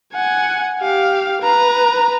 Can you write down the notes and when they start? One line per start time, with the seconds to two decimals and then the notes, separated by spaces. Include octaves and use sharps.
0.14 F#5 G#5
0.81 G4 F5
1.42 B4 A#5